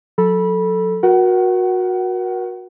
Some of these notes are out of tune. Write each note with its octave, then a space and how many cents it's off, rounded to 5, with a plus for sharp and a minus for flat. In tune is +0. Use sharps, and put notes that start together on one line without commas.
F#3 -30 A4 +0 B5 -25
F#4 -20 A#4 +35 F#5 +30